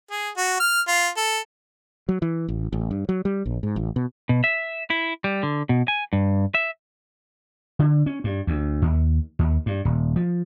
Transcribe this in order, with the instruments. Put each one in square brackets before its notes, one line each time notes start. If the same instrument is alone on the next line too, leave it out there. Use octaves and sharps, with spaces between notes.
[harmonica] G#4
F#4
F6
F4
A4
[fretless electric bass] F#3
E3
A1
A1
G2
F#3
G3
A#1
G#2
A1
B2
[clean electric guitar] B2
E5
E4
G3
D3
B2
G#5
G2
E5
[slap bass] D3
C#4
G2
D2
D#2
D#2
G2
D#1
F3